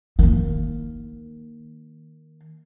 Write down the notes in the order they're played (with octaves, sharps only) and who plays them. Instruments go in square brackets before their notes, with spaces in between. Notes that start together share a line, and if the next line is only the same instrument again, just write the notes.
[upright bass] D#3 A#3